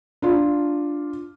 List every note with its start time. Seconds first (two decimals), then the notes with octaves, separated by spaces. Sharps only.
0.22 D4 F4